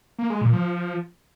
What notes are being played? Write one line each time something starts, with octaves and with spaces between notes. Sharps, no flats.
A#3
G#3
A#2
F3